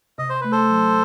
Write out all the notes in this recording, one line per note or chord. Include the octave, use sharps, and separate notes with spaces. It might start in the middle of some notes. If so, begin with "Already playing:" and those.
C3 D#5
C5
A3 B4
A4 C5
F#3